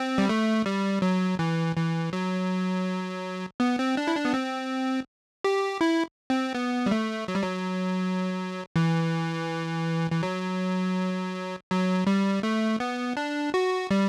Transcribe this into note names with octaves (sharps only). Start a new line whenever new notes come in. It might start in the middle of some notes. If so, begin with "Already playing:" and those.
Already playing: C4
G3
A3
G3
F#3
E3
E3
F#3
B3
C4
D4
E4
D4
B3
C4
G4
E4
C4
B3
G3
A3
F#3
G3
F#3
E3
E3
F#3
F#3
G3
A3
B3
D4
F#4
G3